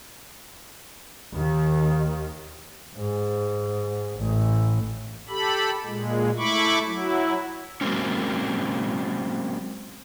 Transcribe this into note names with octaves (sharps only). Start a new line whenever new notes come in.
D#2 D#3
G#2
A1
G4 A4 B5
A#2 G#3
A3 E4 B5 C#6 D6
F#3 E4
F#3 G#3 A#3 C4 C#4